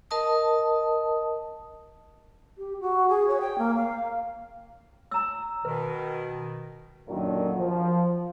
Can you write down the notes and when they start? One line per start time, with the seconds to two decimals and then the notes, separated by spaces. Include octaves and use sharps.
0.11 A#4 D#5 A5 D#6
2.58 G4
2.81 F#4
3.09 G#4
3.28 C#5
3.41 G5
3.58 A#3
3.76 F5
5.11 A#5 E6
5.65 B2 D#3 B4
7.09 F#2 A#2 D3 D#3 F#3
7.57 F3